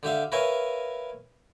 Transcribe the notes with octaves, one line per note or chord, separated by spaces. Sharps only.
D3 G4 E5 F5
A#4 B4 C#5 E5 F5 G#5